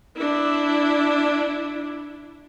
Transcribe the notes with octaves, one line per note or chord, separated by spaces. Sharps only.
D4 E4